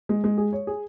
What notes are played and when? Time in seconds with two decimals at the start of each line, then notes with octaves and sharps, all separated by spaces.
0.09 G#3
0.24 G#3
0.38 G#4
0.53 C#5
0.67 G#4